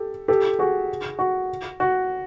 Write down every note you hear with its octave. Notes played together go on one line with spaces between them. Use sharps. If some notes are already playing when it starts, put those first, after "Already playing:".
Already playing: G4 A4
G4 A4
F#4 G#4
F#4
F#4